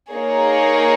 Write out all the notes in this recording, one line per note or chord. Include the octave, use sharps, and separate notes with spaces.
A#3 D#4 G#4 C#5